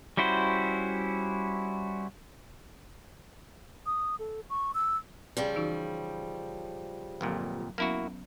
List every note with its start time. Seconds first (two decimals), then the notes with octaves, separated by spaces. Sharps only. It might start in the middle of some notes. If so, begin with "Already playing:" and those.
0.17 G3 C#4 E4 F#4 C5
3.86 D#6
4.19 A4
4.50 C#6
4.74 E6
5.37 C#3 F3 G3
5.56 E3 D#4 F#4
7.21 G1 F2 A#2 F#3
7.78 F#3 A#3 B3 C#4 E4 F#4